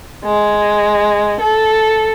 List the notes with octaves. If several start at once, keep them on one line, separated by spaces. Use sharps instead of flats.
G#3
A4